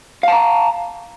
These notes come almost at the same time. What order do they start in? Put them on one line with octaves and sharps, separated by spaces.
F5 A5 A#5